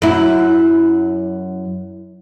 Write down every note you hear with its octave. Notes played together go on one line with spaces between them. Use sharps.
F#2 E4